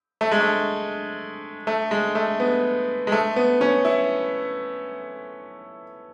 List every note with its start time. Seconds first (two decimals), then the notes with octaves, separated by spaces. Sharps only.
0.21 A3
0.31 G#3
0.41 A3
1.67 A3
1.91 G#3
2.15 A3
2.40 B3
3.07 G#3
3.12 A3
3.36 B3
3.61 C#4
3.85 E4